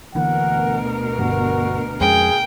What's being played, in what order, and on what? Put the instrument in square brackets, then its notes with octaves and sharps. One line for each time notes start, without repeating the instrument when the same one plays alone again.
[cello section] D2 B2 A#4 [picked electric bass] D3 E3 A#3 [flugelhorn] F#5
[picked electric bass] G1 G2 G3 [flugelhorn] F#4
[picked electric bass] F2 G#3 C#4 [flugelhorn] G#4 [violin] G5